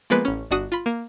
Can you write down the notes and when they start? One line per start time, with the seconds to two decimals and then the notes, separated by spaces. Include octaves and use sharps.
0.10 F3 G#3 A#3 B3 B4
0.25 A1 C#4
0.51 G1 D4 F#4 D#6
0.72 F4 B5
0.86 A#3